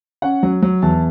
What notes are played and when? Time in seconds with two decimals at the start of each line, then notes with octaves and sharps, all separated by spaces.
0.22 C#4 F#5
0.43 F#3
0.62 F#3
0.82 E2 A5